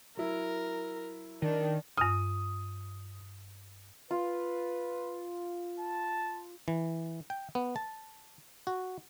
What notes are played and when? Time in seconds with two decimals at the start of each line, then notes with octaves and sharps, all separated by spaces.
0.17 F#3 E4 A#4
1.42 D#3 D4
1.97 G2 D#6 F6
4.11 F4 B4
5.80 A5
6.68 E3
7.30 G5
7.55 B3
7.76 A5
8.67 F#4